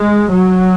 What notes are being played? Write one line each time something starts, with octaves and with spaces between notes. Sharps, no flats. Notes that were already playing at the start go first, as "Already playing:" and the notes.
Already playing: G#3
F#3